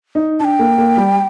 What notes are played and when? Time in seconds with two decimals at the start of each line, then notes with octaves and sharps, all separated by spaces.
0.15 D#4
0.40 D4 G5 A5
0.59 A#3
0.78 A#3
0.97 G3